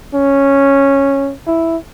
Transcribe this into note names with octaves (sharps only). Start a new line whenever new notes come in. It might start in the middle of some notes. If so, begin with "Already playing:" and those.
C#4
E4